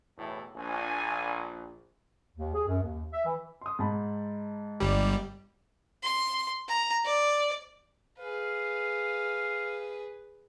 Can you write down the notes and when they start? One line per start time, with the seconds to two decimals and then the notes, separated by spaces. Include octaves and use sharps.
0.17 B1 E2 A2
0.56 A#1 D4 G#5
2.37 D#2
2.53 G#4
2.67 F#2
2.83 D#2
3.13 E5
3.25 E3
3.61 C6 D#6
3.79 G#2 A5 B5
4.80 G1 G3
6.03 C6
6.68 A#5
7.05 D5
8.19 G#4 B4 F5